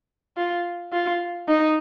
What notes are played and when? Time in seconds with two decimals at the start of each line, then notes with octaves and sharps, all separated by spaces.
0.37 F4
0.93 F4
1.48 D#4